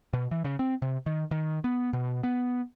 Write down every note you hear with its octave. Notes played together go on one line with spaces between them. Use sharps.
B2
E3
C#3
C4
C3
D#3
D#3
B3
B2
B3